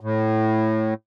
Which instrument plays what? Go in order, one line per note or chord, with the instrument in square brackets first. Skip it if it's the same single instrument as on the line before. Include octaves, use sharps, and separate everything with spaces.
[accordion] A2